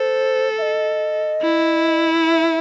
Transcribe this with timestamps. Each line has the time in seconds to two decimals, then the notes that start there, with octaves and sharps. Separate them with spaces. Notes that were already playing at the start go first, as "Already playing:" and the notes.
Already playing: A4 C5
0.58 E5
0.62 D#5
1.42 E4
2.25 E5